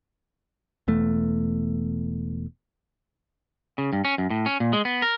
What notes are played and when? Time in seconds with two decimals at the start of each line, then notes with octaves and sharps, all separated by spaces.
0.88 E1 E2 A3
3.78 C#3
3.93 G2
4.05 C#4
4.18 F#2
4.30 A2
4.46 C#4
4.60 A#2
4.73 G#3
4.85 B3
5.02 A#4